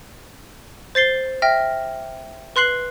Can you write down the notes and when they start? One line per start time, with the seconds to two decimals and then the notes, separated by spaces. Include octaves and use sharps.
0.95 C5 A6 C7 G7
1.42 E5 G5 F6 A#6
2.56 B4 C6 F#6 C7 F#7